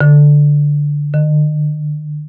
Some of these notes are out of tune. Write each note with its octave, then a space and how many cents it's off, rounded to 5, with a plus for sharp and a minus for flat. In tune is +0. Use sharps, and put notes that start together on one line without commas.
D3 -5
D3 +45